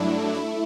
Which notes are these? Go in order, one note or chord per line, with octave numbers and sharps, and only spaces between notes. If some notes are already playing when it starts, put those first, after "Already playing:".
Already playing: G2 F#3 A3 D4 E4
A3 E4